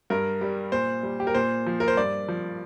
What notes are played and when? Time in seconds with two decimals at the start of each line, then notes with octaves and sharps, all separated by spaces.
0.10 G2 A#4
0.41 G3
0.72 A#2 C5
1.03 G3
1.20 G4
1.27 A#4
1.35 A#2 C5
1.66 F3
1.80 A#4
1.88 C5
1.97 G2 D5
2.28 F3